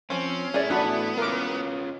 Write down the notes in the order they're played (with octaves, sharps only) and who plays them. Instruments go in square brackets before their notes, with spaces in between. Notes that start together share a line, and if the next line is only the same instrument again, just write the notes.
[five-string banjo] F3 G#5 [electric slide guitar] C4 [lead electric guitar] C#4
[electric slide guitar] A3 E4 [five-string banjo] G#4 D5
[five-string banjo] E3 [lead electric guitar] B3 [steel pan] D4 F#4 B5
[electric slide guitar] C#4 F4 [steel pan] A#4 D6